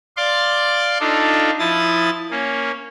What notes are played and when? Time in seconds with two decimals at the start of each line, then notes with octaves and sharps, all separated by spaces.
0.17 D5 F5 C6 D6
1.00 D4 D#4 F4 A4
1.59 F3 E4 D#6 A6
2.31 A#3 C#4